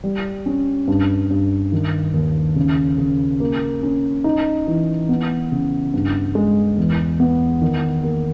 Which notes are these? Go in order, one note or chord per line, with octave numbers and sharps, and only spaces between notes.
G3
C#4
G2
G2
D#3
D#2
C#3
C#3
A#3
C#4
D#4
E3
B3
C#3
G2
G#3
E2
B3
D#3
A#3